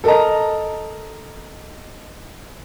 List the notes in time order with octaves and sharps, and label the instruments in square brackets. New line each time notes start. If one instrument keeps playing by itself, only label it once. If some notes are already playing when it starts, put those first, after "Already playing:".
[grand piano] A4 A#4 D#5 A5 A#5